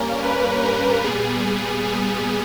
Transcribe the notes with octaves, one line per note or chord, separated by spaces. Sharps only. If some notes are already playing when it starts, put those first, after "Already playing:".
Already playing: G2 G3 A#3 C#4 A#4
B4
A#4
A#2 G3 B3 G#4
G#4